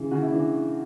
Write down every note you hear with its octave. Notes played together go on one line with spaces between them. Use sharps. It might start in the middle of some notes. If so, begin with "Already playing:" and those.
Already playing: C#3 E3
C#3 F#4
E4
E3 D4